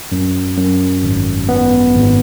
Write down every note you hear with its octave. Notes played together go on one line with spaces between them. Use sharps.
F#2
F#2
G#1
B3
G#1